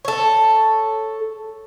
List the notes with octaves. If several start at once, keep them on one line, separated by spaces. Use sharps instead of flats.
A4 C#5